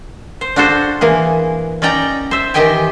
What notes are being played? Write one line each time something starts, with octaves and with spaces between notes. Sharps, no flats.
C5
D4 F4 F#4 A4 C5
E3 A#3 G#4
C#4 D#4 D5 G5 A#5
C5 E5
D#3 E3 G4 D#5 G5 G#5